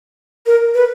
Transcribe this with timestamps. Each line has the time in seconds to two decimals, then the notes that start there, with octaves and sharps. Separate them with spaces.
0.46 A#4
0.74 B4